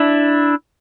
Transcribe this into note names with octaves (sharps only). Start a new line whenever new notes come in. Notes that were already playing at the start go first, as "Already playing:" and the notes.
Already playing: D4 E4